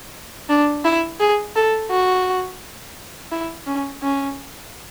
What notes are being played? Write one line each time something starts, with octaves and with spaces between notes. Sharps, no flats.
D4
E4
G#4
A4
F#4
E4
C#4
C#4